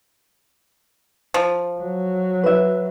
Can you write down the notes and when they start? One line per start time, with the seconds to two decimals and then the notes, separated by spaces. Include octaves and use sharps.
1.34 F3
1.80 F#3
2.44 B4 E5